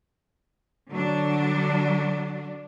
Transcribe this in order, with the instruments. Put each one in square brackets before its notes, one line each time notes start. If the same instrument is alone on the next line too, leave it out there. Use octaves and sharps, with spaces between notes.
[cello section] D3 F#3 D4